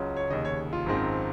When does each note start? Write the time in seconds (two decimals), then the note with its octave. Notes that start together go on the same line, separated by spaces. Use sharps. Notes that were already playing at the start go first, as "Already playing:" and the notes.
Already playing: C#2 C#3 F#3 C#4 F4
0.16 C#5
0.30 F1 D#2 C#3 D#5
0.45 C#5
0.73 F4
0.86 G#1 F#2 D#3 G#3 C4